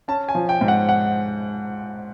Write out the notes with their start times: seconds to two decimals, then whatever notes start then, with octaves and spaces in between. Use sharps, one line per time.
0.08 C#4 A5
0.29 G#5
0.35 F3
0.49 G5
0.61 G#2
0.68 F#5
0.89 F#5